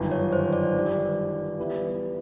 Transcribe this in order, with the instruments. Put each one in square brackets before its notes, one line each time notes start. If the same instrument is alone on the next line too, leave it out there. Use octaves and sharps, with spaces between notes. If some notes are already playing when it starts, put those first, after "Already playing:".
Already playing: [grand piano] G1 F#2 D#3
[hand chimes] C#5
C5
D5
[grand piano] G2 D#3 G3
E3 G3 B3 E4